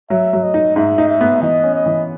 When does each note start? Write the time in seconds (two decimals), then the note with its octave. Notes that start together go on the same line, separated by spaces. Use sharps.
0.10 F#3 E5
0.33 F#3
0.44 D#5
0.54 D#4
0.76 G#2 E5
0.98 D#4
1.09 E5
1.21 B3
1.42 E3 D#5
1.64 C#4
1.75 D#5
1.86 E3